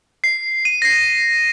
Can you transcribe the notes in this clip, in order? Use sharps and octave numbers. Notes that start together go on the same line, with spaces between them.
C7
D#7
A#6
C7